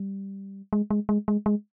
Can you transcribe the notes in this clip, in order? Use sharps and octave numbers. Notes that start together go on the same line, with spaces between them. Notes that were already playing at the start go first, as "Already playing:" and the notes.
Already playing: G3
G#3
G#3
G#3
G#3
G#3